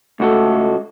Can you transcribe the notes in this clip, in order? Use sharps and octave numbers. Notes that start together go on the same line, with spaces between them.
C#2 A3 F#4 A4